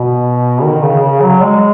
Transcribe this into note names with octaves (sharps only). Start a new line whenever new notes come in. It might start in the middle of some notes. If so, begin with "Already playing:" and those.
Already playing: B2
D#3
C#3
C#3
F#3
G#3